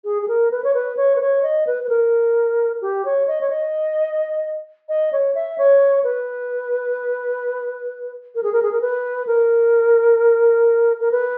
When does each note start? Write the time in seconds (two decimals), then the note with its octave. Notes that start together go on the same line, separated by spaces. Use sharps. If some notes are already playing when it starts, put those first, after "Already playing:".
0.04 G#4
0.22 G#4
0.28 A#4
0.51 B4
0.64 C#5
0.74 B4
0.97 C#5
1.16 B4
1.21 C#5
1.43 D#5
1.67 B4
1.83 B4
1.89 A#4
2.82 G4
3.05 C#5
3.28 D#5
3.41 C#5
3.50 D#5
4.89 D#5
5.12 C#5
5.35 E5
5.58 C#5
6.04 B4
8.35 A#4
8.43 G#4
8.52 A#4
8.62 G#4
8.72 A#4
8.81 B4
9.27 A#4
11.00 A#4
11.11 B4